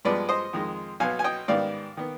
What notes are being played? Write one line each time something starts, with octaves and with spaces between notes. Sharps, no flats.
G2 F3 G#3 B3 B4 D5
C5 D#5
F2 D#3 G#3
B1 B2 B3 F5 G#5
G#5
D#5 G5
G#2 D#3 G3 B3 D5 F5
D#3 B3